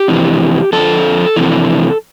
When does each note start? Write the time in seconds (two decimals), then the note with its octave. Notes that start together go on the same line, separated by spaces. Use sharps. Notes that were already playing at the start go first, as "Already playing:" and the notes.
Already playing: G4
0.08 F2 C3 E3
0.73 F2 D3 F3 A4
1.36 F2 C3 E3